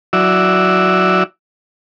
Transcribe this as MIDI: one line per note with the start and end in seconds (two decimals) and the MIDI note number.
0.13 1.23 54
0.13 1.23 64
0.13 1.23 66
0.13 1.23 74
0.13 1.23 76